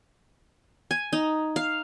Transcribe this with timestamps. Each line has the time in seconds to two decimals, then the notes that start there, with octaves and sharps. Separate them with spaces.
0.91 G#5
1.13 D#4
1.56 F5